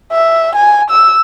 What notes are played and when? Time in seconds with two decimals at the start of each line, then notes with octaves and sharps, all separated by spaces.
0.12 E5
0.55 G#5
0.90 E6